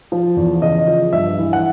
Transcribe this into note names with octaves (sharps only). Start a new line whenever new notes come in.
F3
E2
C#3 D#5
F3
G2 E5
E3
F#5